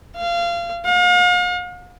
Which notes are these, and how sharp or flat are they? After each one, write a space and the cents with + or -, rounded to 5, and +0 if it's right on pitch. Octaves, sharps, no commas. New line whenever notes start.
F5 -25
F5 +45